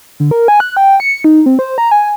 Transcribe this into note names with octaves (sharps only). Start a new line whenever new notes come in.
D3
A#4
G#5
F#6
G5
C#7
D#4
C4
C5
A#5
G#5